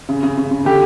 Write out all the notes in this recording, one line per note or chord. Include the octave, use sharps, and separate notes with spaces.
C#3
C#3
C#3
C#3
D3 G4